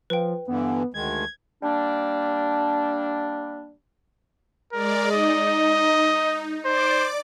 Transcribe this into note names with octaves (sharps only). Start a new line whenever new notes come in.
F3 B4 G5
G2 D3 E3 B3
D2 D#3 G#3 G#6
G3 A#3 D4
G#3 A#4 D5
D#4 D#5
C5 D5 D6